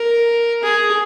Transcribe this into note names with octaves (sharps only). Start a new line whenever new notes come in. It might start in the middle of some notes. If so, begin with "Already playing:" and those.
Already playing: A#4
G#4